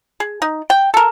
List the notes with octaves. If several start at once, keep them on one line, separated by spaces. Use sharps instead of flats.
G#4
D#4
G5
A4 A#4